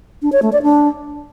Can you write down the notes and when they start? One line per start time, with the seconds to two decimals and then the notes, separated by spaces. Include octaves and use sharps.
0.22 D4
0.32 C#5
0.42 A3
0.52 D5
0.63 D4